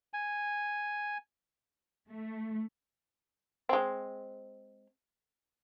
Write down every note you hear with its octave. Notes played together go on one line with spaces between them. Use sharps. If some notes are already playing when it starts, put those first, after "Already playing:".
G#5
A3
G#3 C4